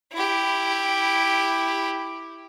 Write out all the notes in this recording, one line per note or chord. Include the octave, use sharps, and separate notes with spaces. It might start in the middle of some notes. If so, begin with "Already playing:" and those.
E4 G4